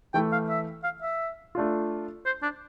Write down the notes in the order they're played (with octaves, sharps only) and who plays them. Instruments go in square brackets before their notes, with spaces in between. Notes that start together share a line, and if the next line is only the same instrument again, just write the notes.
[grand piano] E3 A3 E4 [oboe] G5
[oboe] F5
E5
F5
E5
[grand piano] A3 D4 F4
[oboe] C5
D4